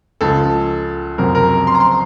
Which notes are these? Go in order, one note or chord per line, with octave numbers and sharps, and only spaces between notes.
C#2 C#3 F3 A4
F#1 F2 C3 F#3 A#4
A#4
C6
A#5
C6